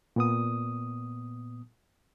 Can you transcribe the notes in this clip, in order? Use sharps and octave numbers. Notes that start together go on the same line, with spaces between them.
A#2 B3 D#6